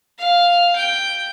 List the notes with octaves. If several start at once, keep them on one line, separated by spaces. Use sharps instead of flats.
F5
G5